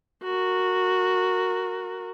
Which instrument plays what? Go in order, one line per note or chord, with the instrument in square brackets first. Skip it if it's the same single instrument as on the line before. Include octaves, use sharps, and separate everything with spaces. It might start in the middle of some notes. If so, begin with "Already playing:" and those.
[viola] F#4 A#4